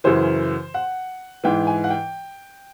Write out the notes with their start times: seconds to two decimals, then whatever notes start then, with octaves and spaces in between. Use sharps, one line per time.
0.04 F#2 C#3 E3 C5
0.74 F#5
1.44 G#2 E3 G5
1.67 G#5
1.84 F#5
1.90 G5